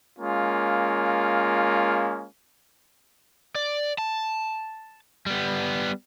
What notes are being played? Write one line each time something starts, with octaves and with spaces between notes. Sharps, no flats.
G#3 A#3 C#4 F4
D5
A5
G3 B3